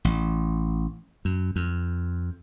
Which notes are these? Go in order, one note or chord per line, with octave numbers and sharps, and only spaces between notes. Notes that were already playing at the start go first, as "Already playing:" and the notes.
A1
F#2
F2